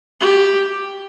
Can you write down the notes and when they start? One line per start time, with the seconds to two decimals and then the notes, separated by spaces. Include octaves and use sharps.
0.20 G4